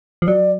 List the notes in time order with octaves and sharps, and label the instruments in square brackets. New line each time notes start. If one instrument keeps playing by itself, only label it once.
[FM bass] F3
[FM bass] F#3 [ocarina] D5